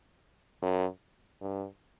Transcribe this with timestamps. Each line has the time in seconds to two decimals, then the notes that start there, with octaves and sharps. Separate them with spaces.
0.62 F#2
1.41 G2